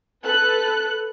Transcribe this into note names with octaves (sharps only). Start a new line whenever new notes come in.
A4 B4 F#6